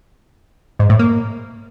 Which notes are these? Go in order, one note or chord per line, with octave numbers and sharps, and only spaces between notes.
G#2
A2
A#3